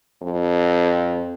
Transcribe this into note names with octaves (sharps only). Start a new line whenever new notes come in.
F2